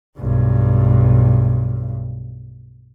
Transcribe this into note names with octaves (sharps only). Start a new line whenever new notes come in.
B1 G2